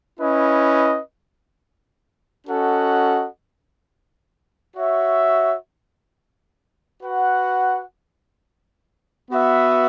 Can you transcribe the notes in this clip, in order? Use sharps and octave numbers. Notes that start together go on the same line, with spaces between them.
C#4 E4 B4 D#5
C#4 F#4 A4 D#5 F#5
F#4 C#5 E5
F#4 B4 F#5
B3 F#4 B4 E5